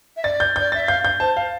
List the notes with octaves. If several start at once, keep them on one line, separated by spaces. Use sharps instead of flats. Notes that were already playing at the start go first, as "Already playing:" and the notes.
E5
D5 A6
G6
D5 G6
E5 A6
F5 G6
G6
C5 A5
F5